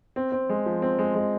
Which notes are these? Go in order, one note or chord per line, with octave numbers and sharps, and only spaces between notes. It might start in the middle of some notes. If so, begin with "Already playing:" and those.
C4
C4
G#3
F3
C4
G#3
G#3